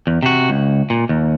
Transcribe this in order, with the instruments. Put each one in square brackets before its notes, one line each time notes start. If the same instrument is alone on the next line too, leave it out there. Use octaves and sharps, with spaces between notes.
[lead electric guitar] E2
C3 F#4
C#2
A#2
D#2